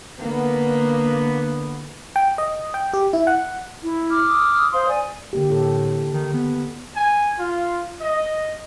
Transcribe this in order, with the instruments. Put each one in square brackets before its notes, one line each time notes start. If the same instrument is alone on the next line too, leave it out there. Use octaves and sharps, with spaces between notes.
[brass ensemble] D3 B3 [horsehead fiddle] A#3
[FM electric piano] G5
D#5
G5
G4
E4
F#5
[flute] E4
[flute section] D6 F6
[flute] D#6
[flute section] C5 F5 C6
D5 G#5
[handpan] D3 A#3 G4
[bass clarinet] A2 [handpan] G4 A4
[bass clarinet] D#3
B3
[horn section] G#5
F4
D#5